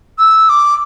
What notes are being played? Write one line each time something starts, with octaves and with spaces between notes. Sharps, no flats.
E6
D6